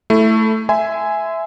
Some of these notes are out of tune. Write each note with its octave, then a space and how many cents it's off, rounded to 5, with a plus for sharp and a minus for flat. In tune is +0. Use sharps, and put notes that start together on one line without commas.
A3 +0 E4 +0
E5 +0 G#5 +0 C6 -30